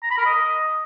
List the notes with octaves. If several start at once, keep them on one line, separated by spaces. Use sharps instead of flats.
A#5
B5
A#4
D#5